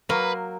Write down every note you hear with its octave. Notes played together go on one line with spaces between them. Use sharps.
F#3 A#3 B4